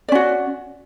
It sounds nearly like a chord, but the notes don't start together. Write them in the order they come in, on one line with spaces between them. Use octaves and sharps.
D5 C#4 F#4